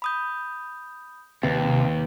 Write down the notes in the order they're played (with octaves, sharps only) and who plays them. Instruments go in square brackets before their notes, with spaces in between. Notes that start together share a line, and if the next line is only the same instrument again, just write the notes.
[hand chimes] B5 D#6 G6
[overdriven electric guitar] D#2 [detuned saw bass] C3 [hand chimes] B4